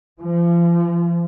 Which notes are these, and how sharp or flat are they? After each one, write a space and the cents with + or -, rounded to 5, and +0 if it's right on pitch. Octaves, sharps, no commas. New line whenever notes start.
F3 -35